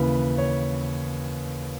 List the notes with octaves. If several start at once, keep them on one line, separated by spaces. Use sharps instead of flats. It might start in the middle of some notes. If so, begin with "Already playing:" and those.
Already playing: D#2 C#3 E3 B4
C#5